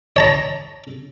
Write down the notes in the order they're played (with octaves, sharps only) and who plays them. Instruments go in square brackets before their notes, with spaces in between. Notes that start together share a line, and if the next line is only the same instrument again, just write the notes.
[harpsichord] C#5 A5 A#5